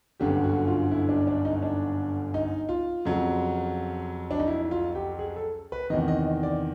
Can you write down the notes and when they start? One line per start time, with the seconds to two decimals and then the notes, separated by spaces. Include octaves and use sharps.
0.20 G1 F#2 D3 G4
0.44 F#4
0.67 F4
0.91 E4
1.09 D4
1.27 D4
1.45 D#4
1.62 D4
2.34 D#4
2.69 F4
3.05 F2 C#3 F#3
4.31 D4
4.40 D#4
4.47 E4
4.71 F4
4.95 G4
5.19 G#4
5.36 A4
5.72 B4
5.90 E2 C3 D#3 D#5
6.08 D#5
6.43 D5